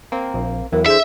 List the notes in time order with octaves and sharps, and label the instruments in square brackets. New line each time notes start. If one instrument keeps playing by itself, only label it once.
[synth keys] A#3 C4
[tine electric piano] A#1
[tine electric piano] E2 F#3 [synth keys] E3 [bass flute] A#4
[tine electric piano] D4 A4 C5 [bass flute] G#4 [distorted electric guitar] E5